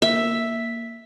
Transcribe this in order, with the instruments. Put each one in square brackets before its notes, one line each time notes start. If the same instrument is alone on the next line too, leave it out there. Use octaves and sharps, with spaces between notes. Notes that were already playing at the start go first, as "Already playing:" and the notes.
[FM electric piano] A#3 B6 [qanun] E5